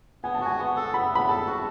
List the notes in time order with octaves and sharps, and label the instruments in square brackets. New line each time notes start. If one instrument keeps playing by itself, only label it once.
[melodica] B3 [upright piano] G#5
[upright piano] A5
[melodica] F#4 [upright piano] G#5
[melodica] B3
A4
[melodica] B3 [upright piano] B5
[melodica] B3 [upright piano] B5
[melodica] A4 [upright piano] A5
[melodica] F#4